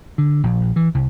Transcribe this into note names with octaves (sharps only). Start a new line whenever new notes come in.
D3
A#1
E3
C2